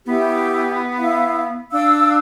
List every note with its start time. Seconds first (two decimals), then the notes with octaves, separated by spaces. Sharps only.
0.06 B3 E4 G4
0.97 E4 F5
1.72 D4 F5 E6